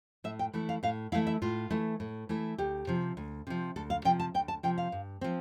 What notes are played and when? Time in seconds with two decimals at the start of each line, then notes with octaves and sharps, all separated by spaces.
0.24 A2 E5
0.39 G5
0.53 E3 A3 E4
0.69 F5
0.83 A2 F5
1.12 E3 A3 E4 F5
1.27 E5
1.42 A2 F4
1.70 E3 A3 E4
2.00 A2
2.29 E3 A3 E4
2.58 D2 G4
2.87 C3 F3
3.17 D2
3.47 C3 F3
3.76 D2 A4
3.90 F5
4.05 C3 F3 G5
4.20 A5
4.34 D2 G5
4.48 A5
4.63 C3 F3 G5
4.78 F5
4.92 G2
5.21 F3 C4